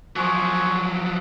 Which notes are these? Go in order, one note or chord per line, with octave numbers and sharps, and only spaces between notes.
F3 F#3 C5 G#5 C#6